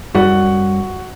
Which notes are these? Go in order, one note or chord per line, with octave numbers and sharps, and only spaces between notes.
F#2 G3 F#4 F#5